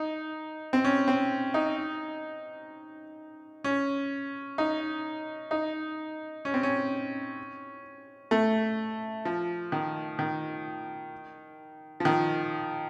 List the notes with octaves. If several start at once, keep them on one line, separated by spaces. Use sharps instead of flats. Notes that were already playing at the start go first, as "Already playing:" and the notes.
Already playing: D#4
C4
C#4
C4
D#4
C#4
D#4
D#4
C#4
C4
C#4
A3
F3
D#3
D#3
F3
D#3